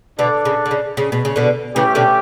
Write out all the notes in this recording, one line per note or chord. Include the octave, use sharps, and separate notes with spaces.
B2 D3 D4 A4 D5
C#3
D3
C#3
C#3
B2
C#3
B2 D3
C#3 E3 A3 C#4 G4
B2 D3